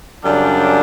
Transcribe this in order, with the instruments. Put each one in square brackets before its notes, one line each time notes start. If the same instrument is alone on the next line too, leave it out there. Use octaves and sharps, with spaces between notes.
[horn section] F#2 C#3 G3 D4